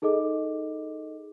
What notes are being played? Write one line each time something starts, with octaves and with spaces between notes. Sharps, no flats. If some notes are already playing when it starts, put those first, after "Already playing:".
D#4 G#4 A4 D#5 D6